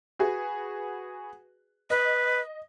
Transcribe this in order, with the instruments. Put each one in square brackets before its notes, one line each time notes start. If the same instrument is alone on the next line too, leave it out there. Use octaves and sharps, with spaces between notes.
[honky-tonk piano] F#4 G#4 B4
[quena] B4 [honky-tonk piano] D#5